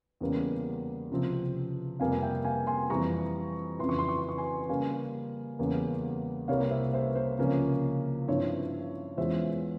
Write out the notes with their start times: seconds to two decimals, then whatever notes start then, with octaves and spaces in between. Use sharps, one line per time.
0.21 E2 C#3 G3 A#3 C#4
1.10 C#2 C3 F3 C4
2.00 F2 C3 G3 A#3 F5 G#5
2.22 E5 G5
2.44 F5 G#5
2.67 G#5 C6
2.90 F2 E3 G3 A#5 C#6
3.79 F2 C#3 E3 C6
3.89 C#6
3.98 C6
4.08 C#6
4.19 C6
4.29 C#6
4.38 G#5 C6
4.69 C#3 G3 A#3 F5 G#5
5.59 E2 C#3 G3 A#3 C#4
6.48 C2 C3 G3 A#3 C#5 F5
6.71 C5 E5
6.93 C5 E5
7.16 C5
7.39 C#2 C3 F3 A#3 C#4
8.28 G2 F3 C4 E4 C#5
9.17 E2 E3 G#3 C#4 F4 C5 E5